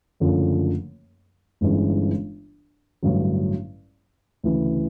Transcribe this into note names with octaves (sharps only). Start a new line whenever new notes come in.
F#1 F#2 D3 F3 A3
G1 G2 E3 G#3 C#4
A1 G2 D3 F#3
D2 C#3 E3